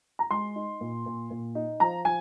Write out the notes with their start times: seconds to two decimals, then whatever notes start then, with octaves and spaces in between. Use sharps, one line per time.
0.19 A#5
0.31 G#3 C6
0.56 D#4
0.81 A#2
1.06 A#2
1.31 A#2
1.55 D#4
1.80 F3 A#5
2.05 F3 G#5